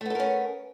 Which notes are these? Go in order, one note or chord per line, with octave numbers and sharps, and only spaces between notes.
A3 B3 C#4 A4 A#4